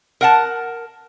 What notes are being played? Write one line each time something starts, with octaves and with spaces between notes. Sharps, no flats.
A#4 F#5 A5